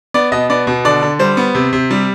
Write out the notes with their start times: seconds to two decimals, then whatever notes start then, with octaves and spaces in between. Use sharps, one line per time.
0.14 B3 D5
0.32 B2 D#5
0.50 B3 D5
0.67 B2
0.85 D3 D5
1.02 D3
1.19 G3 C5
1.37 B3
1.54 C3
1.73 C3
1.91 G3